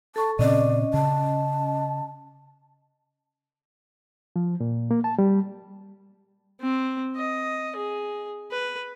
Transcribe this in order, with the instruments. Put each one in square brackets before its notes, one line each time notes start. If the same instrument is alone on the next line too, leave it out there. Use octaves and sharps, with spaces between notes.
[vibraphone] A4 C#6 [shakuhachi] A5
[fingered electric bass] A#2 C#3 C4 [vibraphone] C#4 D#5 [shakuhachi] D5
[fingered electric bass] C#3 [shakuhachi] A5
[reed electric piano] F3
A#2
A#3
A5
G3
[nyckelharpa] C4
D#5
G#4
B4